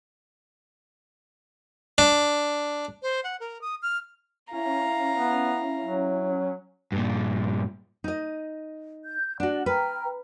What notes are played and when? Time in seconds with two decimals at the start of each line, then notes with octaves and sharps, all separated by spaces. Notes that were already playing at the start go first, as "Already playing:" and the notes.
1.98 D4
3.03 C5
3.24 F#5
3.40 A#4
3.61 D#6
3.82 F6
4.53 C#4 E4 F5 A#5
5.14 B3
5.81 F#3
6.92 G2 A#2
8.04 D#4 D#5
9.04 G6
9.40 D4 F#4 D5 F#5
9.66 B4 G5 A#5 F6